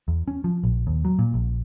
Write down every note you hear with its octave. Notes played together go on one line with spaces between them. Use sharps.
E2
C#4
F3
A#1
D#2
F#3
A#2
A#1